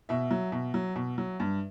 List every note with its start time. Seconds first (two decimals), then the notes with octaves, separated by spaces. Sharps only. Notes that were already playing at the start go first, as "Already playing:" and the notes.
0.09 B2 E5
0.31 F#3
0.52 B2
0.74 F#3
0.96 B2
1.18 F#3
1.40 G2